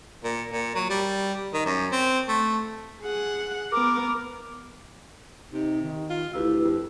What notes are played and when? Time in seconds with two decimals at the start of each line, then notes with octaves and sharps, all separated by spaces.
0.24 A#2
0.52 A#2
0.75 F#3
0.90 G3
1.53 D#3
1.66 F#2
1.91 C4
2.28 A3
3.02 G#4 F#5
3.72 B3 A#4 D6
5.52 C3 D#4
5.82 D#3
6.10 F4
6.34 D2 E4 G4 B4 E6
6.64 F2